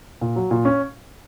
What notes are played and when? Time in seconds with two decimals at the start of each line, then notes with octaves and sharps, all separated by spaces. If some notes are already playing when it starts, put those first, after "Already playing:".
0.21 A#2
0.36 F#3
0.51 A#2
0.65 C#4